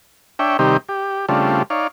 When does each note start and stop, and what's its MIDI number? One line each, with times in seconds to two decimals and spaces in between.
0.39 0.57 62
0.39 0.57 73
0.39 0.57 76
0.39 0.57 79
0.59 0.77 48
0.59 0.77 51
0.59 0.77 55
0.59 0.77 60
0.59 0.77 63
0.59 0.77 67
0.89 1.26 67
1.29 1.63 49
1.29 1.63 55
1.29 1.63 57
1.29 1.63 60
1.29 1.63 62
1.29 1.63 65
1.70 1.87 63
1.70 1.87 73
1.70 1.87 74
1.70 1.87 77